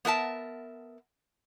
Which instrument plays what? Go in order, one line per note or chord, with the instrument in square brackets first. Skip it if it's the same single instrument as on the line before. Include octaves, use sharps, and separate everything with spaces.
[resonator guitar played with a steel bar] B3 A#4 E5 A5